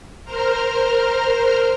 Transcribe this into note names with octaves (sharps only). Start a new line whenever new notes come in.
A#4 C5 A#5 F6